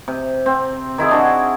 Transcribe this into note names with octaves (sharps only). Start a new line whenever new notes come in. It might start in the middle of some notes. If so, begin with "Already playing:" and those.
C3
C4
D#3 E4 G#4 E5
D4 F#4